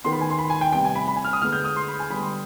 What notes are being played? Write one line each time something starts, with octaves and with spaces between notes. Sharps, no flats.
D#3 B3 C6
B5
G#5
C6
B5
G#5
G5
C3 G3 B3 G5
G#5
B5
B5
G#5
F6
D#6
D3 G#3 B3 F6
G6
D#6
C6
B5
G#5
D3 G3 B3 B5
C6